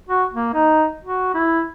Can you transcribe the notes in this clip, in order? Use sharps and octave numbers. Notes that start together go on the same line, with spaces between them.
F#4
A#3
D#4
F#4
E4